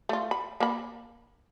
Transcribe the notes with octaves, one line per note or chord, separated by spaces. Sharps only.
A3 F4
B5
A#3 B5